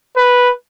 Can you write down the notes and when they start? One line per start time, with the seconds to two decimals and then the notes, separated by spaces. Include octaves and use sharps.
0.17 B4